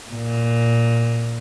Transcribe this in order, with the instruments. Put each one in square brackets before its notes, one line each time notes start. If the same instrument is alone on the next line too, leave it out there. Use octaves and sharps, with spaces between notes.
[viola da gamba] A#2